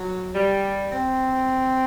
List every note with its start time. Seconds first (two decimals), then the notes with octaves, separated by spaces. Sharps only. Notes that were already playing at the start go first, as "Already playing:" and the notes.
Already playing: F#3
0.35 G3
0.91 C4